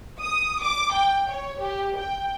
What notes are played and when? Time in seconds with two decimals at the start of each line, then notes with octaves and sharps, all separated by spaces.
0.20 D#6
0.61 D6
0.93 G5
1.28 C#5
1.58 G4
1.96 G5